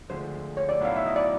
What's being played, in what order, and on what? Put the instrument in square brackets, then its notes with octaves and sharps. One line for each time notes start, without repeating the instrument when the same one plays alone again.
[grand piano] D2 D3 F3 G#3 [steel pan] C5
[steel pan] C#5
D5
[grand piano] B1 A2 F#3 B3 E4 [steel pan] F5
[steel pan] E5
D#5
D5